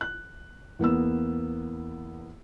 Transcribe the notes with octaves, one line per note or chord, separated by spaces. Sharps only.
F#6
E2 A#3 B3 E6